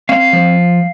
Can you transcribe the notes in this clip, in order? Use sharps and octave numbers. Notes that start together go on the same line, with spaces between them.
C4 F5
F3